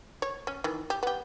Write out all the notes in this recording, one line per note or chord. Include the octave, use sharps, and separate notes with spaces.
C#5
C#4
D#3 E3
G4
B3 G4